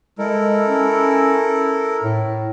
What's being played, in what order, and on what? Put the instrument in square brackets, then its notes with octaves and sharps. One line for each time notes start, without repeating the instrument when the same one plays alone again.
[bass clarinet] G#3 [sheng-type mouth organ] E4 A4 A#4
[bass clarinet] C#4
A2